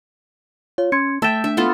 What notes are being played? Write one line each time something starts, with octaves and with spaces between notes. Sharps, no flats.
F4 C#5
C#4 C6 G#6 C#7
A3 E5 G5 A5 A6 E7
D4 E5
B3 F4 A4